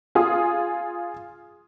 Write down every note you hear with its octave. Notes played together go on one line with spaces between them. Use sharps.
F4 G#4 D#6